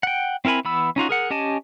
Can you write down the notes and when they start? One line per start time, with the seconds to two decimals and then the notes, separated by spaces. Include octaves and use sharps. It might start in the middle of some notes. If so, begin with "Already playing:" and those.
0.03 F#5 G5
0.45 C4 E4 A#4 G#5 B5
0.65 E3 B3 B5 E6
0.96 C#4 D#4 F4 F#4
1.09 G#4 A#4 F#5
1.30 C#4 G4 D#5 G#5 A5